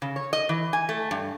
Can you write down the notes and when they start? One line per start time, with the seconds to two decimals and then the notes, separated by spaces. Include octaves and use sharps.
0.02 C#3
0.16 C#5
0.33 D#5
0.49 E3
0.73 G#5
0.89 A3
1.11 G2